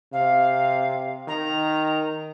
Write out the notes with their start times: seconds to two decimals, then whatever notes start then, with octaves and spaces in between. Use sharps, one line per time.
0.13 C3 F5
1.28 D#3 A#5